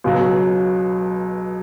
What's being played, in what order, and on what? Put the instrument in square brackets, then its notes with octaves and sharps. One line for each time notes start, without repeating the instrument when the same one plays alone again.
[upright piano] C#2 B2 F#3